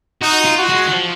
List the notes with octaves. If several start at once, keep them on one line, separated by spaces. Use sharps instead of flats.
D#4 F#4
F4
F#4
G#3
D#3
F3